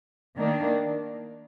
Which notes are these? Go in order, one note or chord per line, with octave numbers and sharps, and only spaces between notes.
D#3 A#3 D4